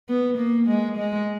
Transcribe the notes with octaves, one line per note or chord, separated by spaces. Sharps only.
B3
A#3
G#3
G#3